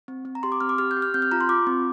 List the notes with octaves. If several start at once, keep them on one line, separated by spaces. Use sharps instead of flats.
C4
C4
A#5
G4 C6
D6
C4 F6
D6
G4 F6
G6
G4
F6
C4 G6
F6
F4 A#5
C6
F4 D6
C4